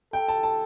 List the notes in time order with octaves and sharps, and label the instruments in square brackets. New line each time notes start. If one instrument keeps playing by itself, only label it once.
[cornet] A4 [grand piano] G5
[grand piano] A5
A5